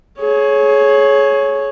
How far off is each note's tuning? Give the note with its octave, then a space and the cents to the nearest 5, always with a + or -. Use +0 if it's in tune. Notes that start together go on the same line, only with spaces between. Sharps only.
G#4 +30 C#5 -5